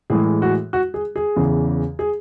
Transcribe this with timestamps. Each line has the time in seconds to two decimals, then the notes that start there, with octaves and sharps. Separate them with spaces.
0.10 A2 E3 G#3 G#4
0.42 F#4
0.73 F#4
0.94 G#4
1.16 G#4
1.36 E2 C#3 E3
1.99 G#4